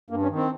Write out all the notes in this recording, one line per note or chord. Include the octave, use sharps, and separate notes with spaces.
G2 A#3
C#4
D#3
C4